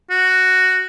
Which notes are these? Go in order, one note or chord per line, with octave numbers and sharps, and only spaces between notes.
F#4